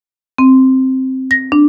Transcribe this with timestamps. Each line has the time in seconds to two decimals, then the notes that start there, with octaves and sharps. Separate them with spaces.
0.38 C4
1.31 A#6
1.52 D4